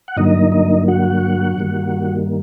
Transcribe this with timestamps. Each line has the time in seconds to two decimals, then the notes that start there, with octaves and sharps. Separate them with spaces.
0.08 F#5
0.17 G2 D3 F#3 A#3 D#4 D#5
0.52 D#4 D#5
0.88 F#4 F#5
1.58 G2 D#3 G3 A#3